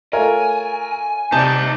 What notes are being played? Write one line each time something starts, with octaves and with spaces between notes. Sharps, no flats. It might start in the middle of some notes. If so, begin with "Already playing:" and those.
A3 F4 A#4 C#5 G#5
C3 D#4 D5 A5